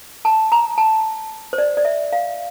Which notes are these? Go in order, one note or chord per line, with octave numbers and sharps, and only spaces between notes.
A5
A#5
A5
C5
D5
D5
E5
F5